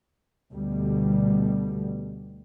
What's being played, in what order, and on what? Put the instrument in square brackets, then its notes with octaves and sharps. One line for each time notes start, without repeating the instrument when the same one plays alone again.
[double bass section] D2 B2 G3